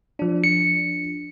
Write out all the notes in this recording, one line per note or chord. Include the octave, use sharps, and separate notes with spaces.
F3 D4
C#7